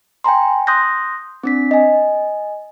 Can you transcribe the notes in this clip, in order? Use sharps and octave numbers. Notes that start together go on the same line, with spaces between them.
G5 G#5 A#5 C6
C6 D#6 F#6 G6 A#6
C4 D4 B6
D#5 G#5